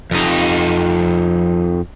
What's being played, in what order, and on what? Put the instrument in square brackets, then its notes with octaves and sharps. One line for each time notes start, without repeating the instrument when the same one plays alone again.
[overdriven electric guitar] F2 D#4